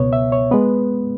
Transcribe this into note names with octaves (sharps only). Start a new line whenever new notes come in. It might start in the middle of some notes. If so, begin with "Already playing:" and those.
Already playing: C#2 B2 B3 C#5
E5
C#5
G#3 B3 B4